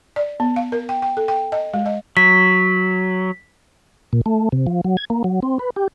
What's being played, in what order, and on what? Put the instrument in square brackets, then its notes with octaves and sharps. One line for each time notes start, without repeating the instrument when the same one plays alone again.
[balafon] D5
B3
F5
A#4
G5
G5
A4
G5
D#5
G#3
D#5
[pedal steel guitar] F#3 [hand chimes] B6
[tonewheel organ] A#2
A3
C3
F3
F#3
G#6
A#3
F#3
C4
B4
G4